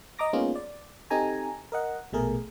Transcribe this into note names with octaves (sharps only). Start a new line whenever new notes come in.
D#5 A#5 D6 A#6
G#3 A#3 B3 C#4 D#4 F4
D5
C4 D#4 G4 A4 G#5 A#5
A#4 D#5 F#5
A#1 B2 A3 G#4 A#4